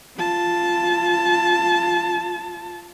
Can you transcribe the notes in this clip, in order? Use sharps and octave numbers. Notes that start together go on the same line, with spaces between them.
F4 A5